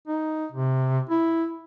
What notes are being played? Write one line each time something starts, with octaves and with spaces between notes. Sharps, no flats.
D#4
C3
E4